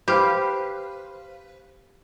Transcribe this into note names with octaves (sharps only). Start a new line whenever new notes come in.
G4 B4 C5 F5